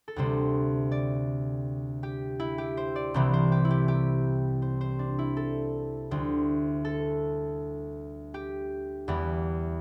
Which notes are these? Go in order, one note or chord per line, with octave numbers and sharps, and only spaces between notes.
A4
D2 C3 G3 C5
D5
G4
E4
G4
C5
D5
C2 C3 E3 G3 C5
C5
G4
E4
G4
G4
C5
C5
D4
E4
A4
D2 D3 G3 C5
A4
G4
E2 E3 G3